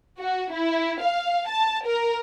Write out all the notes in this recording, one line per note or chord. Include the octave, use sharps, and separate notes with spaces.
F#4
E4
F5
A5
A#4